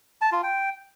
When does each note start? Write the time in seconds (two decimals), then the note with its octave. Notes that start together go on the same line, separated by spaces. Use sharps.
0.21 A5
0.32 F4
0.43 G5